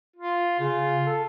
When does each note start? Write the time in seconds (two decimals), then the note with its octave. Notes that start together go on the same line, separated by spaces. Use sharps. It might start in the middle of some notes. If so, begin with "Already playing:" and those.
0.16 F4
0.60 C#3 F4
1.07 A4